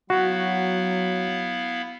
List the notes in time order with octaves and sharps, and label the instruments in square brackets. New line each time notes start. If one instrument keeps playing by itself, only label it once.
[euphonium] F#3 [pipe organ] B3 E4 F5 [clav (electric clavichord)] F#4